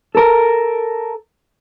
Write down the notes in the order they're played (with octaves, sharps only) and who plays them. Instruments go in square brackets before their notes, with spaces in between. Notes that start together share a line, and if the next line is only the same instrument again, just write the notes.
[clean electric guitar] A4 A#4